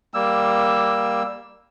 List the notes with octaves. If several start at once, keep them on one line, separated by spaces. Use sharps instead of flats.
G3 A#3 E6